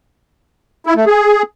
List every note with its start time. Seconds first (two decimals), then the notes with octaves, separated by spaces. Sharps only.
0.86 E4
0.96 A3
1.06 G#4